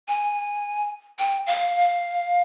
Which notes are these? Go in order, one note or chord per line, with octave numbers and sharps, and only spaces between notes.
G#5
G5
F5